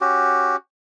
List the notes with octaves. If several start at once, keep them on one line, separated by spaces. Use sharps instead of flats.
C#4 F#4 G4